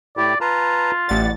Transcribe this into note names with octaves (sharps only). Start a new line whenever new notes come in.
A2 E4 G4 D5
F4 B4 A5 A#5
A1 D5 F#5 A6